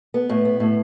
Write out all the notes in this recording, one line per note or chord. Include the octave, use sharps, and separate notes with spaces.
B3
A2
B3
A2